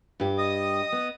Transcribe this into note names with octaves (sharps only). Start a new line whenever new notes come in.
G2 G4
D#5 D#6
B3